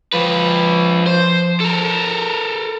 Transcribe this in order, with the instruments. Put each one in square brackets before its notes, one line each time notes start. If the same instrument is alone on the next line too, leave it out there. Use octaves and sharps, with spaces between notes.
[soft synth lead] F3 [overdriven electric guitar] F4 B4
[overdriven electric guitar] C5
A4 A#4